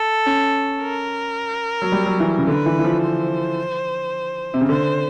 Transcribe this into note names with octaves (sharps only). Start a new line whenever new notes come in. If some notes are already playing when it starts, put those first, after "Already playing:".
Already playing: A4
C#4
A#4
F#3
G3
F#3
E3
C#3
D3 B4
E3
E3
F3
C5
C3
C#3
D3 C5